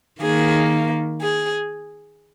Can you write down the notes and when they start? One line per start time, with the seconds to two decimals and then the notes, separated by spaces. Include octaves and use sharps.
0.22 D#3 A#3 G#4
1.21 G#4